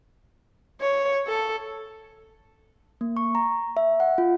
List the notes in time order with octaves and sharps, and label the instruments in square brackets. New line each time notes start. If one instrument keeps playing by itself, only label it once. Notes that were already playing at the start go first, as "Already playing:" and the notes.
[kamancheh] C#5
A4
[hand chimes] A#3
C#6
A#5
E5
F#5
F4